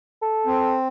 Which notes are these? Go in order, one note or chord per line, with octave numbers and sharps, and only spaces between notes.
A4
C4